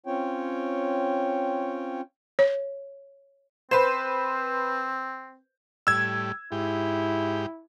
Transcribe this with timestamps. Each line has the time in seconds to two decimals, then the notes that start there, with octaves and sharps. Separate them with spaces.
0.06 C4 C#4 F4 C#5 G5
2.39 C#5
3.71 C4 B4 C5
5.87 A2 G3 E6 G#6
6.52 G#2 E4 G4